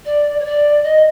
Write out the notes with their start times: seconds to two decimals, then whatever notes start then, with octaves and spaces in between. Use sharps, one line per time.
0.05 D5
0.40 C#5
0.45 D5
0.83 D#5